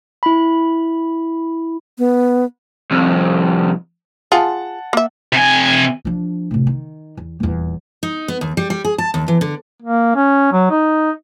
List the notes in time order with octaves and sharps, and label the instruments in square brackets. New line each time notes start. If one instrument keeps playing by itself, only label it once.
[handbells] E4 B5
[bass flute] B3
[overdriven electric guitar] C2 F2
[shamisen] F4 G#4 [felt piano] F#5 A5
[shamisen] A#3 E5
[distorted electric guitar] C3 G#5
[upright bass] F3 D4
A2 C3
D#3
E2
D#1 E2
[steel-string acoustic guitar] D#4
B3
D#2
G3
G3
G#4
A5
D#2
E3
D3
[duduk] A#3
C#4
F#3
D#4